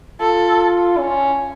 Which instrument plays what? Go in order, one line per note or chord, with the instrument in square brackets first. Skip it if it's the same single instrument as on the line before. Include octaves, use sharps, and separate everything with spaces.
[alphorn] F4 [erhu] A4
[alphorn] C#4